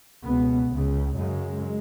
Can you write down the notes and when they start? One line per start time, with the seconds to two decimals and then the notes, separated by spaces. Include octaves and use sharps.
0.24 C#2 B2 B3
0.70 C#2
0.75 C#3
1.16 F#2 C#3 G#3